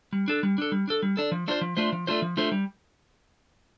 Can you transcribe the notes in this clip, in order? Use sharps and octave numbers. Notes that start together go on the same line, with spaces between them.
G3
D4 A4
G3
D4 A4
G3
D4 A4
G3
D4 A4
F3
A3 D4 F4 C5
F3
A3 D4 F4 C5
F3
A3 D4 F4 C5
F3
A3 D4 F4 C5
G3